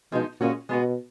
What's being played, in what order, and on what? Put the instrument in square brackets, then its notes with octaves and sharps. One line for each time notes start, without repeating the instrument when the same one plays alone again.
[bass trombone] B2 [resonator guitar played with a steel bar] F3 G#3 D#4
[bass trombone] A#2 [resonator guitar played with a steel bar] G#3 C#4 F#4
[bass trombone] B2 [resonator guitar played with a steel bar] G#3 B3 F#4